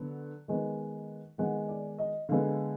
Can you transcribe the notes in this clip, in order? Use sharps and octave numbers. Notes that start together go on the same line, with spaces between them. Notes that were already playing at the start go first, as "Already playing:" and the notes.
Already playing: D3 F#3 B3
D#3 G#3 B3
D#3 G#3 B3 F#5
D5
D#5
D3 G#3 B3 F5